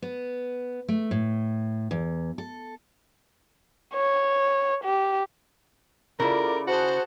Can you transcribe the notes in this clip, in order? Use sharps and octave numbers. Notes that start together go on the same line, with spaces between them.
B3
A3
A2
E2
A4
C#5
G4
C#3 E4 F4 A4 A#4 D5
F#4 G#4 C5 F#5 A5